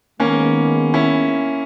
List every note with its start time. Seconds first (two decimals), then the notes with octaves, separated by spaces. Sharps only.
0.20 D#3 G#3 A#3 B3 C#4
0.94 C#4 E4